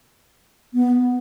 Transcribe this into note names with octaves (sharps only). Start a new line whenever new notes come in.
B3